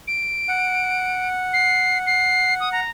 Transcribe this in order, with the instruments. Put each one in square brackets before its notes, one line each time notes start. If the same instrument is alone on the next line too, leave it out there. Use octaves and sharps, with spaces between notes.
[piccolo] D7
[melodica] F#5
[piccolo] C7
C7
D#6
A#5